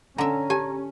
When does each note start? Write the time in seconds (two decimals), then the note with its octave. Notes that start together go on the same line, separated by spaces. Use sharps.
0.18 D3 C#4 E5 A#5
0.50 G4 G#5 A5